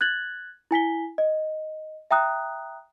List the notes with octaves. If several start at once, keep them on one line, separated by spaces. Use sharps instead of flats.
F#6 G#6 A6 F#7
E4 G#5 B6 G7
D#5
E5 G5 A#5 D#6 F#6